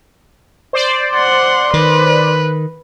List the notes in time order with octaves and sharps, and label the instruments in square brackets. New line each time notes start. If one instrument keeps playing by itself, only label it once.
[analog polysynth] C5 D5
[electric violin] F#5 C6
[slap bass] D#3 [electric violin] B4